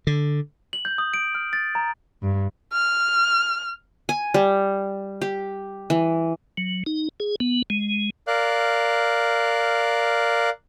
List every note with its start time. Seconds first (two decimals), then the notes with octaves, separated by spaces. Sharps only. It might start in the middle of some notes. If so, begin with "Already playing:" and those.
0.07 D3
0.73 F#7
0.85 G6
0.98 D#6
1.14 D7
1.35 F6
1.53 A6
1.75 A#5
2.22 G2
2.73 F6
4.09 G#5
4.34 G3
5.21 G4
5.90 E3
6.57 F#3
6.86 D#4
7.20 G#4
7.40 B3
7.70 G#3
8.27 A#4 D5 F5 F#6